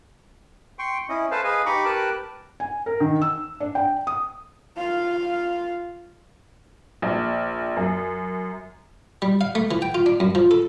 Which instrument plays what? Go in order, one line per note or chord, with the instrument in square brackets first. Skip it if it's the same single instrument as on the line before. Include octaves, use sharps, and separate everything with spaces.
[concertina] G5 C6 C#6
C#4 E4 D#5
A4 B4 C5 F5 A5
G#4 B4 D#5 F5 G#5
D#4 G4 A#5 B5 C#6 D6
G4 A#4 B4 G5 A5 F#6
[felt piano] G#5
A#4
D#3
E6
D4
G5
D#6
[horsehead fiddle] F4 F5
[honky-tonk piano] A#1
F#2
[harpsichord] G3
F5
A3
E3
G5
F4
D4
F#2
F3
A4